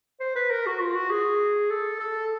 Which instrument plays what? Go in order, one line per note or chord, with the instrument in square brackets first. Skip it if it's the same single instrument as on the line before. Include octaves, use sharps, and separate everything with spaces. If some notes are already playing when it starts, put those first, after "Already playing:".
[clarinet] C5
B4
A#4
F#4
F4
F#4
G#4
A4
A4